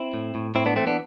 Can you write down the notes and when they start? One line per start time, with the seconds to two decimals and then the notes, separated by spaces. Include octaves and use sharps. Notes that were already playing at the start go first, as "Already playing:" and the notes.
Already playing: C4 E4
0.14 A2
0.35 A2
0.55 A2 C4 E4
0.66 B3 D4
0.76 E3 A3 C4
0.87 B3 D4